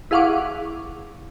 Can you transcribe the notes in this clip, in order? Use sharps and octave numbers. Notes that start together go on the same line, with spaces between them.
E4 G#4 F5 F#5 C#6 D6